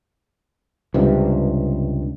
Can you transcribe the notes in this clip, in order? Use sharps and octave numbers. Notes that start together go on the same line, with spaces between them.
C#2 G2 C3